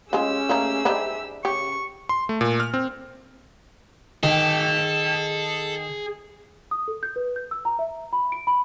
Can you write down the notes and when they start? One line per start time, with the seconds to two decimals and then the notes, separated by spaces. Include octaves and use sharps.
0.13 G#3 C#4 F4 G4 G#4 E6
0.49 A3 A#3 D#4
0.85 G3 D4 D#4 C5 E5
1.45 C#3 G4 C#6
2.09 C6
2.29 A3
2.41 A#2
2.60 F6
2.74 C4
4.23 D#3 G#4 A4 G5
6.71 D#6
6.88 A4
7.03 G6
7.16 B4
7.36 G6
7.51 E6
7.65 A#5
7.79 E5
8.13 B5
8.32 D7
8.47 B5